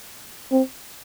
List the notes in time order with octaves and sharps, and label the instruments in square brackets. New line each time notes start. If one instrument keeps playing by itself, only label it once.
[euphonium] C4